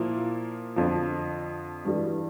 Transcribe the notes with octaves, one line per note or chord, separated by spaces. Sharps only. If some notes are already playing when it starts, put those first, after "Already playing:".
Already playing: A#2 F3 A#3 E4
F2 D3 F3
G2 E3 G3